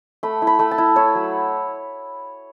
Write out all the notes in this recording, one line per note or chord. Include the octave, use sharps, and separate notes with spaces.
A3 B5
E4
B5
A3
A5
E4
E4 C#5
F#3